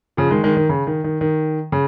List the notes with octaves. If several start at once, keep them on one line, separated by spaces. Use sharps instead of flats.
C#3 F3
D#3 G#3
D#3 G#3
D#3
C#3
D#3
D#3
D#3
C#3